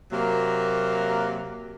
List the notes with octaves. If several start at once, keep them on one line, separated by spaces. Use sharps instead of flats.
C3 F#3 A#3